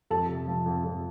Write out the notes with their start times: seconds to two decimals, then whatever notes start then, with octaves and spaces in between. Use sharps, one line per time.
0.10 F2 A4 A5
0.28 C3
0.47 F3
0.66 F2
0.84 F2